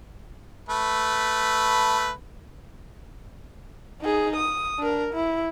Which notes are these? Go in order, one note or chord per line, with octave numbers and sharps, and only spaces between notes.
A3 B4
D#4 G#4
D#6
D4 A#4
E4